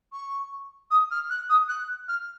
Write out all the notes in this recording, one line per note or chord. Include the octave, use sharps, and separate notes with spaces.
C#6
D#6
F6
F#6
D#6
F#6
F6